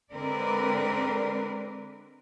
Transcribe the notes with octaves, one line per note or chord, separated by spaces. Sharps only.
D3 G#3 C4 A#4 B4 D5